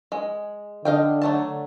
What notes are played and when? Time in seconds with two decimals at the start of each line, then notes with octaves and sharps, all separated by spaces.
0.12 G#3
0.85 D3 D#5 F5 G5
1.22 F#3 A3 A5